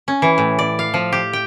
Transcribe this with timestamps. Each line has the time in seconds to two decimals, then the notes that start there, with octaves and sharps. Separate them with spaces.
0.08 C#4
0.22 E3
0.38 A2
0.59 D5
0.79 F5
0.94 F3
1.12 G4
1.33 G5